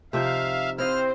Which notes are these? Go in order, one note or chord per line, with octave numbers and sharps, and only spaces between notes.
C3 F3 D#4 E5 F5
C4 E4 C5 D#5 F5 F6